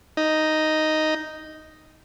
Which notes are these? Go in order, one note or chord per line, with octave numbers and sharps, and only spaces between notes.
D#4